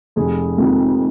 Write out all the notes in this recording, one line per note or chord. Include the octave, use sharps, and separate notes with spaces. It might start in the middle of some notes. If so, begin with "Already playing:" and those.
F1 G#4
F2 C3 D#3 G#3